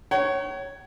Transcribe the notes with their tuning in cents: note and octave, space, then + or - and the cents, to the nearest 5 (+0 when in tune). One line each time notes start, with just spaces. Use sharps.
C#5 +0 F#5 +45